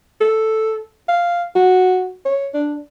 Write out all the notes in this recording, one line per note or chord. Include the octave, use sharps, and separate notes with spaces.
A4
F5
F#4
C#5
D4